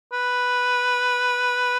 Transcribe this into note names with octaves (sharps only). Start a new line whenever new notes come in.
B4